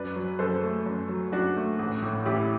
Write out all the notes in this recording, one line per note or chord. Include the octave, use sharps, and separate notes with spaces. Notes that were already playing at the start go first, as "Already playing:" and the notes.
Already playing: F#2 B4 D5
F#3
F#2 A4 C5
A3
F#2
F#3
F#2 D4 F#4
A3
A1
A2
A1 E4 G4